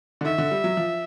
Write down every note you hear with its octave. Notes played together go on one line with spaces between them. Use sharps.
D3
D#3 E5
D3
G3
F#3
F3